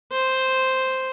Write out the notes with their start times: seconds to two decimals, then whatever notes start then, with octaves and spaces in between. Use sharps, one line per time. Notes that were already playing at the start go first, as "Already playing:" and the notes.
0.12 C5